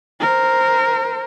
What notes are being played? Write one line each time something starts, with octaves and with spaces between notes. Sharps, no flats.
A#4 C5